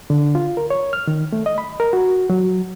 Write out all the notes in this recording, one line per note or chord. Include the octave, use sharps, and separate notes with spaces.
D3
F4
A#4
C#5
F6
D#3
A3
D#5
B5
A#4
F#4
F#3